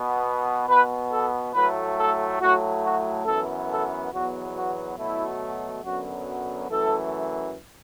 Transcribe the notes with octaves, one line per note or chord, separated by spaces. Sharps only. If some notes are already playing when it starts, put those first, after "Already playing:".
Already playing: B2 B3
B2 B3 B4
A4
A2 F#3 A3 B4
A4
A2 F#3 A3 F#4
F#4
F#2 E3 B3 A4
A4
E2 B2 F#3 B3 F#4
F#4
B2 F#3 A3 E4
F#2 D3 F#3 B3 F#4
F#2 E3 A3 A4